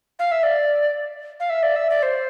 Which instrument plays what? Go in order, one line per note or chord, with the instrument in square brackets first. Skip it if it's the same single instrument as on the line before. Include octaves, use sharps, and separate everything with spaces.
[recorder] F5
E5
D5
F5
E5
D5
E5
D5
C5